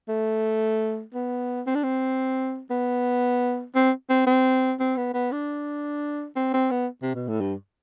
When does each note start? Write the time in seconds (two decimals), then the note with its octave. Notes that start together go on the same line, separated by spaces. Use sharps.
0.09 A3
1.14 B3
1.66 C4
1.75 D4
1.83 C4
2.70 B3
3.75 C4
4.09 C4
4.27 C4
4.80 C4
4.97 B3
5.14 B3
5.32 D4
6.36 C4
6.54 C4
6.71 B3
7.02 C3
7.15 B2
7.28 A2
7.41 G2